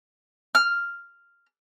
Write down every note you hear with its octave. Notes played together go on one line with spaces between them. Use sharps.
F6